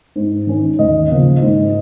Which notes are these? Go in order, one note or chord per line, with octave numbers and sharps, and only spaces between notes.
G#2
D#3 C#4
D#2 D#5
C#3 F3 A#3
G#2